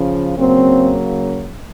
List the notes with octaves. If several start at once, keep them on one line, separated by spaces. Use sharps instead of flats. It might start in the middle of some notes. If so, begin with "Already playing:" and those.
Already playing: C#3 F3
C#3 F#3 A#3 C4